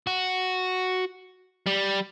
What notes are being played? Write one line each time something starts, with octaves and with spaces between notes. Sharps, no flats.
F#4
G3